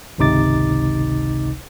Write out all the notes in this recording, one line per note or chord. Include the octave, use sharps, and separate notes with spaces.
G#1 C#2 C3 D#4 D6 A6